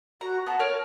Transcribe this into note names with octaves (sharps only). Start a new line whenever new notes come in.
F#4 A#5
B3 F#5 A5 A#5
A#4 C#5 F5